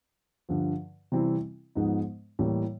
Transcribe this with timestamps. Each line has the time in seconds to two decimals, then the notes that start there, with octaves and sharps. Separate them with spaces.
0.49 G2 D3 F3
1.12 C3 E3 G3 C4 E4
1.75 G#2 F3 G#3 B3 D#4
2.39 A2 E3 G3 A#3